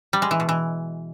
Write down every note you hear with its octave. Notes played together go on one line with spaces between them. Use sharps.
G3
G#3
E3
B2
E3